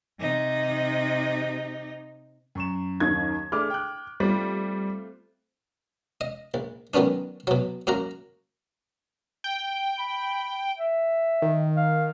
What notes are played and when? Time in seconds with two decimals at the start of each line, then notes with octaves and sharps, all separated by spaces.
0.20 C3 D#4
2.55 F#2 C#6 E7
3.00 D#2 D#3 G#6
3.52 A3 D4 G#4 D6 F6
3.70 G5 F#6
4.20 G3 A3 C4 F4
6.21 D#5
6.54 A#1
6.94 D#3 F#3 B3 C#4 D4
7.47 B2 F#3
7.87 F#2 A#3 F#4 A#5
9.44 G5
9.99 B5
10.78 E5
11.42 D#3
11.77 F5